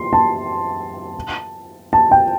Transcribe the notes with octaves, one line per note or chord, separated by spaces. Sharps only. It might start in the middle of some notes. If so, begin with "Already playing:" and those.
Already playing: C6
A5
A5
G5